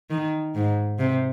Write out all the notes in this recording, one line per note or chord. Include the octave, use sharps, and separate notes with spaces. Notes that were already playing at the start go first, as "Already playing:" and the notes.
D#3
G#2
C3